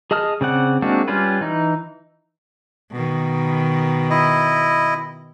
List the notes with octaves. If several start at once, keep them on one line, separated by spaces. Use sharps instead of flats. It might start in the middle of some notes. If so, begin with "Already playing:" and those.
G#4 D#5 A5 D#6 F6
C#3 C4 D5 F#5
G#3 A#3 C4 D4 F#4
G3 C#4 F4 B4
E3 D#4
B2 D#3
E4 D#5